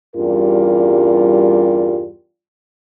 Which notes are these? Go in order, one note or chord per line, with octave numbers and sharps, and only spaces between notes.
E2 G2 G3 C#4 F4 A#4